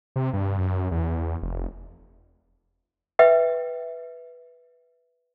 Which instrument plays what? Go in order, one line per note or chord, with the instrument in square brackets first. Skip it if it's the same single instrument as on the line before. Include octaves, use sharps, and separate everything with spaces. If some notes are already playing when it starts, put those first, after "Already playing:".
[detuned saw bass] C3
G2
F#2
E2
F1
[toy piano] B4 E5 G5